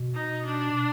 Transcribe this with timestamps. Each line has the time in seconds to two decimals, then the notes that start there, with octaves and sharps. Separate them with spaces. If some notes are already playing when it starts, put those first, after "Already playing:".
Already playing: B2
0.15 D#4
0.46 D4